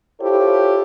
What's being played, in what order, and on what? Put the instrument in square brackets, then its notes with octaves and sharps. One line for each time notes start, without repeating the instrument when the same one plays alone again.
[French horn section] E4 F4 G4 A4 C5 C#5